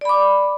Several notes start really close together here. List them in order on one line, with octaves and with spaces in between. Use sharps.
D5 B5 D6